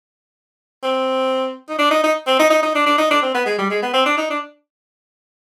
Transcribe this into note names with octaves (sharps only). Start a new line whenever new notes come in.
C4
D#4
D4
D#4
D#4
C4
D#4
D#4
D#4
D4
D4
D#4
D4
C4
B3
G#3
G3
G#3
B3
C4
D4
D#4
D4